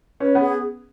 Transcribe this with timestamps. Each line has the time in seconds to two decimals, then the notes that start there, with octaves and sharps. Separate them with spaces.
0.20 C#4 B4
0.35 B3
0.40 G#4